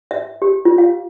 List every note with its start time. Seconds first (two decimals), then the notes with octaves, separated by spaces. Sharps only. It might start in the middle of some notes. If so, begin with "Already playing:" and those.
0.11 E5
0.42 G4
0.65 F4
0.78 F5